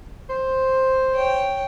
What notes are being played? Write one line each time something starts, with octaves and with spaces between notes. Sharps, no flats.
C5
C#5 G5